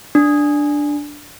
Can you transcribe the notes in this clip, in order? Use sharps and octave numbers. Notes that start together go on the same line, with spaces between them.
D4